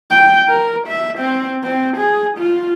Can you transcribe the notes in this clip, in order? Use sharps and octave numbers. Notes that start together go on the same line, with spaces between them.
G5
A#4
E5
C4
C4
G#4
F4